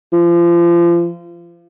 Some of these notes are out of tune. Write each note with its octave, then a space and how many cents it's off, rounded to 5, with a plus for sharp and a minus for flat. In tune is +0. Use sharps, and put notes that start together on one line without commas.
F3 -30